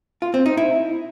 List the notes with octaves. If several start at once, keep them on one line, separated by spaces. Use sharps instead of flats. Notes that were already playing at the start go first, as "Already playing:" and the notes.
F4
C4
D#4
E4